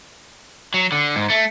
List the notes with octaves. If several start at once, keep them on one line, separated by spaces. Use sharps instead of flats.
F#3
D3
G#2
A3